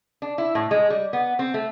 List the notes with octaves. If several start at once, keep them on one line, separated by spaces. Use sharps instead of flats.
D4
E4
A2
G#3
G3
B3
C4
A3